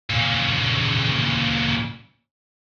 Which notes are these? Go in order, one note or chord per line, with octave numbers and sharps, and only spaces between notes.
A#2 C#3